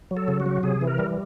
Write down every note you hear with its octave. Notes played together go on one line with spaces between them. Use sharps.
F#3
A4
C#3
F#4
F#3
C3 G#4
E3
A#4
G3